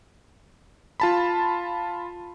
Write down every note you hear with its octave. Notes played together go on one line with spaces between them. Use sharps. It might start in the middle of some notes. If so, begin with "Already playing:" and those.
F4 A5 B5